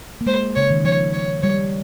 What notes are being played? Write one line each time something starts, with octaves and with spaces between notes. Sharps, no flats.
A#3
G#3 C5
C#3 C#5
D#3
F3 C#5
C#5
G3 C#5